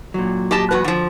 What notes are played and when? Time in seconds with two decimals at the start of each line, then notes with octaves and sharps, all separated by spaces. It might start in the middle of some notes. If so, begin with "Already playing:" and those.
0.14 A#2 F#3
0.51 G4 D#5 A5
0.71 E2 F#4 B4
0.84 D3 F3